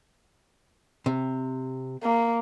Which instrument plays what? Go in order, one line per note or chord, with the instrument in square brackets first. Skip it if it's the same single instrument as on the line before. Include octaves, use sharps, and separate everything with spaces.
[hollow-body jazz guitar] C3
[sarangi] A#3